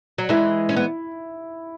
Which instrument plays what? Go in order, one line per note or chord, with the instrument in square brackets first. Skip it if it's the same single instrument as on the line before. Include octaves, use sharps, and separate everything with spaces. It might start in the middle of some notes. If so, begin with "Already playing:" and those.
[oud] F#3
[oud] E3 G#3 [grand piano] E4
[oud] C#4
B3